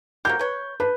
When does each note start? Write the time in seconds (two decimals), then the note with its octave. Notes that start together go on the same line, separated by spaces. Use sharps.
0.25 A#3 F#4 G4 G6
0.39 B4 C#5
0.80 D4 B4